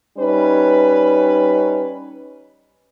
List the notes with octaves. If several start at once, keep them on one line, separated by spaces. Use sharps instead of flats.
G3 C#4 D#4 B4